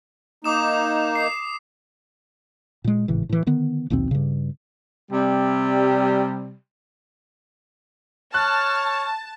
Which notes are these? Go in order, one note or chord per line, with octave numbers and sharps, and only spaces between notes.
A#3 D#4 D6 D#6 E7
C7
A#2 G#3
G#1 A2 C#3 E3
A2 E3
D3 D#3 B3
A#1 D#2 B2 C4
G2 C#3
C3 G3
C#5 A5 F6 F#6